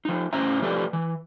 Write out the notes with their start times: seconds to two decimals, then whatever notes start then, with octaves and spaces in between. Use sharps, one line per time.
0.05 F3 D#4
0.33 A2 C#4 C5 E5 A#5
0.62 F3 G4 A4 B4 D5
0.93 E3